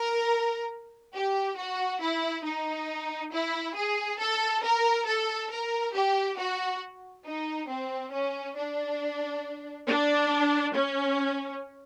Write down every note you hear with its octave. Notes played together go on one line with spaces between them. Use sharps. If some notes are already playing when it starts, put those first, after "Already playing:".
Already playing: A#4
G4
F#4
E4
D#4
E4
G#4
A4
A#4
A4
A#4
G4
F#4
D#4
C4
C#4
D4
D4
C#4